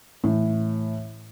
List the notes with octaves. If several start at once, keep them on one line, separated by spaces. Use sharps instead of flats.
A2 E3